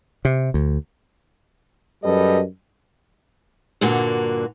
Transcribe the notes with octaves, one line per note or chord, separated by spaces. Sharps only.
C3
D2
F#2 G3 A4 B4 D#5
G2 A#2 D3 A#3 F#4